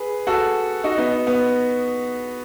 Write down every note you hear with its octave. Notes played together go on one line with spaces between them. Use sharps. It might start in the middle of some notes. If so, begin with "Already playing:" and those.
Already playing: G#4 B4
F#4 A4
D#4 F#4
B3 D#4
B3